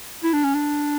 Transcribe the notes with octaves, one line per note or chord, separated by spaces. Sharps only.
E4
D4
C#4
D4